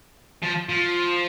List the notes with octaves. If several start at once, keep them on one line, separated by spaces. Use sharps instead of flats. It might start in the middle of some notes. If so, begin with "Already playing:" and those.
F3
F3